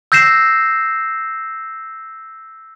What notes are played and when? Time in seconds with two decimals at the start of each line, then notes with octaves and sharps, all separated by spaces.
0.12 E6 G6 A#6 C7 E7